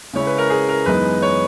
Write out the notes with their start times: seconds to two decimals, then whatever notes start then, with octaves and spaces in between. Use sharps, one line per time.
0.13 C#3 G#3 C#4 E4 C#5
0.27 B4
0.38 A#4
0.50 G#4
0.69 A#4
0.86 F#2 E3 G#3 B3 D#4 B4
1.22 C#5